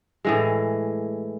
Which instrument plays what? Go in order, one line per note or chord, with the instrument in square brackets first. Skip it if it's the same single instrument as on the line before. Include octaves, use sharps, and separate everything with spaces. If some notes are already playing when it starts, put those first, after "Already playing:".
[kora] A2 E3 G#3